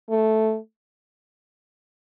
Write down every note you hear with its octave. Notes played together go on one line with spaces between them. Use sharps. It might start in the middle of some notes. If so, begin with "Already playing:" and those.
A3